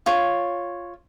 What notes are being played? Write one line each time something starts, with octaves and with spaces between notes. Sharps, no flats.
F4 C#5